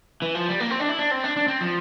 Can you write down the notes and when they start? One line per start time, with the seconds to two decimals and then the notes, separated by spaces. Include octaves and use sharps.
0.22 E3
0.35 F3
0.48 G3
0.60 A#3
0.70 C4
0.80 D4
0.89 E4
0.98 D4
1.11 C4
1.24 D4
1.36 D4
1.48 C4
1.61 F3